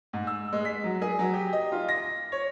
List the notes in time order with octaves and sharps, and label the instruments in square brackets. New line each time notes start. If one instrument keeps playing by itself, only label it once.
[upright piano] G#2
E6
G#3
B6
F#3
G#4
F#3
G4
D#5
F4
A#6
C#5